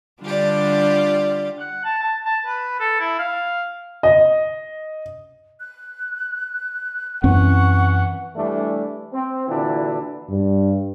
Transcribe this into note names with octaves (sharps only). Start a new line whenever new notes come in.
D3 G3 D4 F4 G4 D5
F#5
A5
A5
A5
B4
A4
E4
F5
D#5
F#6
F#2 E3 C4 C#4 F#5 C#6
E3 G3 A3 D4
C4
A#2 D3 E3 D4 E4 F#4
G2